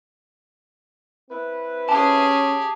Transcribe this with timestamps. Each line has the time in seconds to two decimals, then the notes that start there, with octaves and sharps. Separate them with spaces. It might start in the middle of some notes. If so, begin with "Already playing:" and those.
1.30 C4 E4 B4
1.89 C#4 G4 G#4 A5